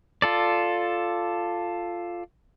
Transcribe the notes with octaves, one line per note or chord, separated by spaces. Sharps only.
F4 A4 D5